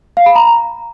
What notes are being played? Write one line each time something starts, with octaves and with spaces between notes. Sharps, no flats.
F5
B5
A#5